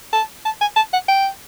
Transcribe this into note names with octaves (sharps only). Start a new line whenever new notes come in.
A5
A5
G#5
A5
F#5
G5